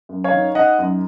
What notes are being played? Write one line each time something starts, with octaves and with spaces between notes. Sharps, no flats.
F#2
C#5 F5
D#3
D#3 D#5 F#5
F#2